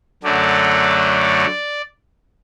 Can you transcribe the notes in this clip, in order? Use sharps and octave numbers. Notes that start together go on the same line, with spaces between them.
F#2 D3 F#3 A3 D5